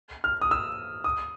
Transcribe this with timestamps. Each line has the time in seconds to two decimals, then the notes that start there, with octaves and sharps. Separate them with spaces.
0.24 F6
0.42 D#6
0.51 E6
1.04 D#6